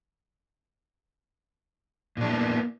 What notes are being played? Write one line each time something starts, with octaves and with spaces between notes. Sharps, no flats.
A#2 A#3 B3 D4 E4